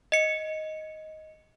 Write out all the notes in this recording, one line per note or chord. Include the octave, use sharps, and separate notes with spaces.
D#5 C#7